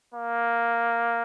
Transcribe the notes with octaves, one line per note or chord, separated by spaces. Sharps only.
A#3